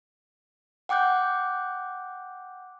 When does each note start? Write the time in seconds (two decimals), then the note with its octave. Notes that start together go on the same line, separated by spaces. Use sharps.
0.89 F#5 G5 D6 F#6 G6